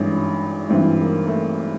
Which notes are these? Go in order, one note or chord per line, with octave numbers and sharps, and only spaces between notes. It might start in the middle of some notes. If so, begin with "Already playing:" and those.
Already playing: G#1 G2 E3 C#4
G#1 G2 E3 C4
A#3
A3